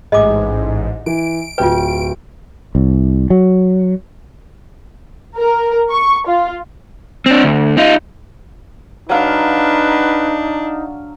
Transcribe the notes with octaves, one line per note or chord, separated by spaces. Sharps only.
A1 G#2 G#4 D#5 D6
E3 D7
D1 F4 B4 G5
C2
F#3
A#4
C#6
F4
C4 D4
D2
D#4 F4
F#3 D4 D#4 B4 F5